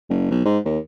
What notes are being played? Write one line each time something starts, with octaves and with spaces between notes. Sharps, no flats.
F#1
B1
G#2
D#2